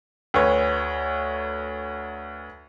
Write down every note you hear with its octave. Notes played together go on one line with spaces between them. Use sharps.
D2 B4 C#5